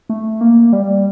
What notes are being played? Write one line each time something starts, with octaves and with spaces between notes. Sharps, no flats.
A3
A#3
G3